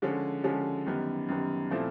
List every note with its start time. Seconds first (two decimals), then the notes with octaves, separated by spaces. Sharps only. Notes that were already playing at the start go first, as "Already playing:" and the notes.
0.02 D3 F3 G#3 C#4
0.44 D3 F3 G#3 C#4
0.86 F#2 D#3 G3 B3
1.28 F#2 D#3 G3 B3
1.71 A#2 F3 A3 C4 E4